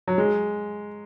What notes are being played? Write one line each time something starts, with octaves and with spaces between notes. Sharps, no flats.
F#3
G#3